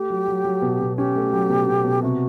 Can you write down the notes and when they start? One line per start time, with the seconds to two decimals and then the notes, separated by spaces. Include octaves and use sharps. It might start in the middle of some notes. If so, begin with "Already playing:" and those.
Already playing: A3 G4
0.10 F#3
0.28 F#3
0.45 F#3
0.62 B2
0.80 B2
0.97 C#4 G4
1.16 A3
1.33 F#3
1.49 B2
1.67 B2
1.84 B2
2.02 C3 F#4